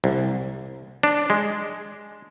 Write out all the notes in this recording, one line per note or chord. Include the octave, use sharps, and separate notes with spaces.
C2
D4
G#3